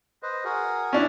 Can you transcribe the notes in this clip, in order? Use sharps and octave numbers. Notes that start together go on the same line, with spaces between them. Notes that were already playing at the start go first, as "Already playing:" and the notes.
B4 C5 D#5
F#4 G#4 A#4
C#4 D4 E4